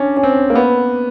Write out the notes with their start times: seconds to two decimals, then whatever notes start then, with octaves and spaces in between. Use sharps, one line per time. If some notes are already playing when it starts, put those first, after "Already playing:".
Already playing: C#4 D4
0.17 C#4
0.23 C4
0.50 A#3
0.55 B3